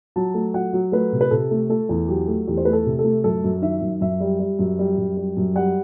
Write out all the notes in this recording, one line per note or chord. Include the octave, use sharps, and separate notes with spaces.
F#3 A5
A3
F#3 F#5
F#3
A3 B4
C3
B4
C3 A4
A3
A3 A4
E2
F#3 G4
A3
E2 G4
C5
A3 B4
A4
C3
A4
A3
F#2 A4
F#2
D#3 E5
F#2
F#2 E5
G3
G3
F#2
G3
F#2
G3
F#2
G3 F#5